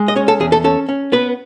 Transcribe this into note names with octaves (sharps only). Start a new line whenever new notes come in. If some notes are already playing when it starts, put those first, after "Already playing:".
Already playing: G#3
D#5
C#4 C#5
A4
E2 G#4
A4
C#4 A4
C#4
B3 B4